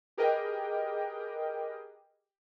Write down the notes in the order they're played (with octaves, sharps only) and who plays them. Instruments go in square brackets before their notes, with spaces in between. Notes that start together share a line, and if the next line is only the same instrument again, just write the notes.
[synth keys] G4 G#4 A#4 B4 D#5 G5